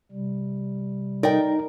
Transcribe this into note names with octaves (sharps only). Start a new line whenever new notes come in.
C3 G3
D#4 A#4 D5 G5